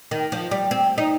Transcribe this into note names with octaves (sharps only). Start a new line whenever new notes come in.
D#3
F3
G3
C4
D#4